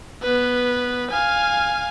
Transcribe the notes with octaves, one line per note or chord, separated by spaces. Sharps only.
B3 B4
F5 G#5